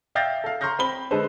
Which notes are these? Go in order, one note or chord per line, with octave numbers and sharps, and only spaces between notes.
E5 F5 G5 G6 A6 A#6
A4 F5
A#5 C6 C#6 F6 G6 A#6
C4 B5 G7
D3 G#3 A4 B4 C5